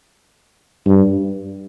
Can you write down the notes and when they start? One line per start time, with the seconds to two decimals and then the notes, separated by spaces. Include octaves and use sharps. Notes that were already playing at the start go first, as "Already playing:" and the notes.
0.86 G2